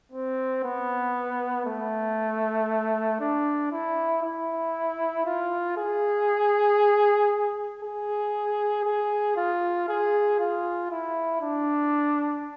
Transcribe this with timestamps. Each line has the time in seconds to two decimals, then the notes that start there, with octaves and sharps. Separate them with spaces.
0.11 C4
0.63 B3
1.66 A3
3.20 D4
3.71 E4
4.22 E4
5.26 F4
5.77 G#4
7.82 G#4
8.85 G#4
9.37 F4
9.88 G#4
10.40 F4
10.91 E4
11.42 D4